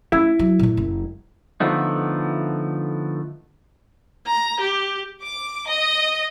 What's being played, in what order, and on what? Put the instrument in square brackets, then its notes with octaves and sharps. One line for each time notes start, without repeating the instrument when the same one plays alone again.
[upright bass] A3 C#4 [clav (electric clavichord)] E4
[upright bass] F#3
A#2 A3
F#1
[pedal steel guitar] D3 F3 A3 B3 D#4
[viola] A#5
G4
[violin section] D6
D#5